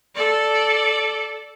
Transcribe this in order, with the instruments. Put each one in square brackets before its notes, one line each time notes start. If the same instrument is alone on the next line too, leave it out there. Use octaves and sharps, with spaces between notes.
[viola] A4 D5